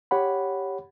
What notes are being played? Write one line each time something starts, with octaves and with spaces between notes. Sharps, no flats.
G4 C#5 F#5 B5